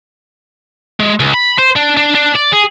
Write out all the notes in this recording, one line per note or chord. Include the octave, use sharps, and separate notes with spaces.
G#3
C#2
B5
C5
D4
D4
D4
D5
G#4